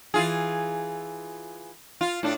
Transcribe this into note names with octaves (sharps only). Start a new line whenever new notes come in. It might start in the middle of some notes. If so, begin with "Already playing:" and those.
E3 F4 G#4
F4
A2 D4